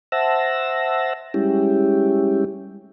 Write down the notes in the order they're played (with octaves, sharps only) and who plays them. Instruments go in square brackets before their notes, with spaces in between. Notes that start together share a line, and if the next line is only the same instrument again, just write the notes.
[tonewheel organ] C5 E5 F#5 A5 E6 A#6
G3 G#3 C#4 E4 G4